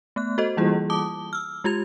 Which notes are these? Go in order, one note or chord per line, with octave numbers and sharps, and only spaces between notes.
A3 B3 F#6
F#4 A4 C5 D#5
E3 G3 A#3 E4 F4 G#4
A5 D6 D#6 G7
E6 F6
G#3 F4 G4 G#6 F7